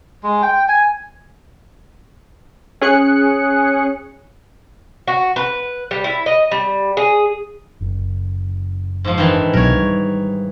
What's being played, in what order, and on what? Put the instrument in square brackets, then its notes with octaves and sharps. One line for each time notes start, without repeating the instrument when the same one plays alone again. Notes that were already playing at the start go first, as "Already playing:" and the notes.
[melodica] G#3
G5
G#5
[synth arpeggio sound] C#4 G#4 F#6 C#7
[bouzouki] F#4
B4
G3
E4
D#5
G3
G#4
[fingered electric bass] F#1
[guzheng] G#2 F3
D#3 E3 D4
[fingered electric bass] C2 B2 F#3 [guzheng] A#4 C#5
[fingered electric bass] G3